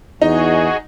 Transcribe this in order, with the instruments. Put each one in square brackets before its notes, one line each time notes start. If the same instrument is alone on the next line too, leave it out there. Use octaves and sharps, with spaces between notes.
[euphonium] E2 [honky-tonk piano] D#4 [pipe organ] F#4 G#4 [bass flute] D#5